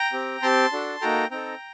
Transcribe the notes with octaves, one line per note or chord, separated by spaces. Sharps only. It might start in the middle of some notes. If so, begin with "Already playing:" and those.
Already playing: G5 A#5
C4 G4
C4 G4 A5 C6
D4 F#4 A4
A#3 D#4 F#4 A4 G5 A#5
C4 D#4 A4 G5 A#5